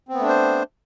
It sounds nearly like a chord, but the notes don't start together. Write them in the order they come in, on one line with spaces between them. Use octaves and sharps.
C4 B3 A3 D4 C5